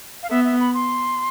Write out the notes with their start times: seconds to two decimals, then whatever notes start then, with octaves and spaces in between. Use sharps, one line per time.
0.23 F5
0.30 B3 E5
0.44 E5
0.60 B5
0.74 C6